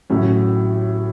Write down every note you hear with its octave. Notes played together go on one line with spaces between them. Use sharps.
A1 A2 F#3 C#4